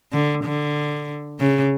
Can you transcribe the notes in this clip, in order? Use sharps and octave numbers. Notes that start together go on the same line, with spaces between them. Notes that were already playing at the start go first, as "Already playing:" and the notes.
D3
D3
C#3